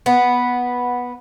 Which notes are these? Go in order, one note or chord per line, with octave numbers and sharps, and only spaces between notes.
B3